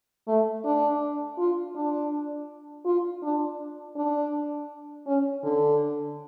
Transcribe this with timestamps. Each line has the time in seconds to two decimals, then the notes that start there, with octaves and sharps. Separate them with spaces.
0.28 A3
0.65 D4
1.38 F4
1.76 D4
2.86 F4
3.23 D4
3.96 D4
5.06 C#4
5.44 D3